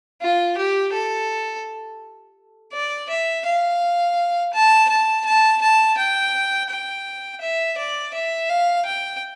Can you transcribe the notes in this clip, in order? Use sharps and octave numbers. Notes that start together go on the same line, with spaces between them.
F4
G4
A4
D5
E5
F5
A5
A5
A5
A5
G5
G5
E5
D5
E5
F5
G5